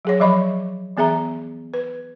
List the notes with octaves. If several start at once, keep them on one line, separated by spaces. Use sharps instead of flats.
F#3 G#4 C#5
F3 F#3 D#5 B5 C#6
E3 B3 G#4 E5 A#5
B4